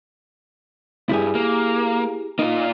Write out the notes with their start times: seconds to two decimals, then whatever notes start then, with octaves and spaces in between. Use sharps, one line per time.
1.09 C#2 G2 E4 G4 G#4
1.35 A#3
2.39 A#3 D#4 F4